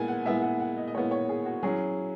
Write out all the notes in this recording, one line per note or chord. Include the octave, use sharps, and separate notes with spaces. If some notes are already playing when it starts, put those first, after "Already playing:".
Already playing: A#2 G#3 B3 E4 G#5
F#5
A#2 G#3 B3 E4 E5
F#5
F#5
D#5
D#5
A#2 G#3 B3 E4 C#5
C#5
G#4
F#4
F#3 C#4 E4 G#4